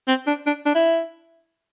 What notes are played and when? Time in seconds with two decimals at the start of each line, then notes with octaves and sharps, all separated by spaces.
0.08 C4
0.27 D4
0.46 D4
0.66 D4
0.75 E4